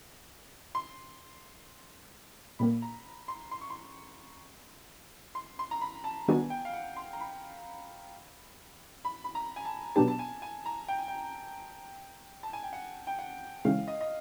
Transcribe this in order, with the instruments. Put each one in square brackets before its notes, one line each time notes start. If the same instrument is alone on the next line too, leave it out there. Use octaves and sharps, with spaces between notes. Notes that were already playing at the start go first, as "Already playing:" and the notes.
[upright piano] C6
[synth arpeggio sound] A#2 G3 A#3 [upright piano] B5
[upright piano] A#5
C6
C6
C#6
C6
C6
C6
A#5
B5
A5
[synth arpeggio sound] D#3 G3 B3 D4 F#4 [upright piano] G#5
[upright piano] G5
F5
F#5
C6
A#5
B5
B5
B5
A#5
G#5
A5
[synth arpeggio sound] B2 F#3 B3 D4 G4 [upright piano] A5
[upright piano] A5
G#5
G#5
A#5
G5
G#5
G5
A5
G#5
G5
F#5
G5
F#5
[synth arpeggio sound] C#3 E3 G#3 C#4 E4 [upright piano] F5
[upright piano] D#5
D#5